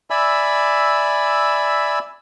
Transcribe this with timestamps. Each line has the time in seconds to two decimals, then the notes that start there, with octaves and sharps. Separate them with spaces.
0.10 D5 E5 G#5 B5 E6